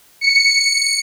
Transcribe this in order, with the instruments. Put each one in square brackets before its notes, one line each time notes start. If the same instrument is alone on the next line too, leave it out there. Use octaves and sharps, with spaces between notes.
[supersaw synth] C#7